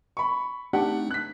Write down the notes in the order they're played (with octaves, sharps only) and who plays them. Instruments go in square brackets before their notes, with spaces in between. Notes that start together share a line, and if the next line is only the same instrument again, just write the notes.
[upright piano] B5 C#6
[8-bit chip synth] A3 C4 D#4 [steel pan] D4 [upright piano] G4 F#5 A5
[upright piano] F#6 B6